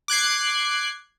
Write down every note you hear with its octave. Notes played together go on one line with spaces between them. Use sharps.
D6 F#6 G#6 C7